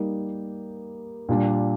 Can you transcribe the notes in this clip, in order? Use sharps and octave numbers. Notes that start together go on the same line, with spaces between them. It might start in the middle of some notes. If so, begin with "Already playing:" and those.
Already playing: G3 A#3 D#4
A#2 G3 D4